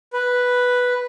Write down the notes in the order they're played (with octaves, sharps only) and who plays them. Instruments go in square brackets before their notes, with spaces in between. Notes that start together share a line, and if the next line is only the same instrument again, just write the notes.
[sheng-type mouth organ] B4